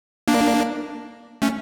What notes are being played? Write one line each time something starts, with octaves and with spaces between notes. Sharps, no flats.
A#3 D4
A3 C#4